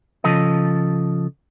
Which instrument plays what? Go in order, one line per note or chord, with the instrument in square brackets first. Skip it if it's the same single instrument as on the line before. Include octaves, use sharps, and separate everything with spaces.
[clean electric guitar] C#3 F3 A4 D#5